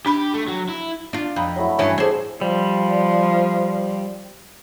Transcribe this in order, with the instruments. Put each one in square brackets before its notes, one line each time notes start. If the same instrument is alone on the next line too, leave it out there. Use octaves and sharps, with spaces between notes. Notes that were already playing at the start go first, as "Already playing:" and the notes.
[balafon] D4 B5 [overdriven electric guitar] G4
[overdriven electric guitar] A3
F#3
E4
[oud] D4 F4
[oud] F2 [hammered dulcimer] D#5 A#5 B5
[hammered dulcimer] F#3 A3 E4
[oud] G2 E3 C#4 [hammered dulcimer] G#4
[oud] G#4 C5 [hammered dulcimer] A4 D5 D#5
[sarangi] F3 [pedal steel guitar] G3